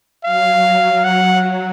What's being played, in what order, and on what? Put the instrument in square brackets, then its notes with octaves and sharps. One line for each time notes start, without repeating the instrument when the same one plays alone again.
[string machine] F#3 [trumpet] F5
[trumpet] F#5